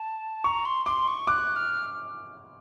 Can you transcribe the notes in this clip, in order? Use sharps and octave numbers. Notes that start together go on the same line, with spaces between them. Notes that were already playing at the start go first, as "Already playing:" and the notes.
Already playing: A5
A#5 C#6
C6
C6 D6
C#6
D6 F#6
F6